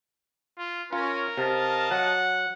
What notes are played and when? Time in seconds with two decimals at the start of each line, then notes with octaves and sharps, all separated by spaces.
0.59 F4
0.93 C#4 F4 A#4
1.38 C3 D#5 F5 A5
1.91 F#3 F#5